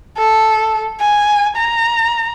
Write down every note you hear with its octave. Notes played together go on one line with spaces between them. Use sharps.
A4
G#5
A#5